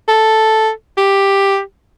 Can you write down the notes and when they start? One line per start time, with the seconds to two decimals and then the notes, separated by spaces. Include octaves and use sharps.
0.08 A4
0.98 G4